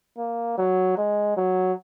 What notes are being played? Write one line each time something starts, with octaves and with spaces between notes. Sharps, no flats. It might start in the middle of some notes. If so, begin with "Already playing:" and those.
A#3
F#3
G#3
F#3